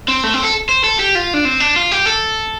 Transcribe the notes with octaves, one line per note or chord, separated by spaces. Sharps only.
C4
A3
C4
A4
C5
A4
G4
F4
D4
C4
D4
F4
G4
A4